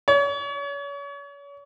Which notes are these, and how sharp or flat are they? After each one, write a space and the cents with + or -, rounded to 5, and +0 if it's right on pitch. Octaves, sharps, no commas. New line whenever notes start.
C#5 +35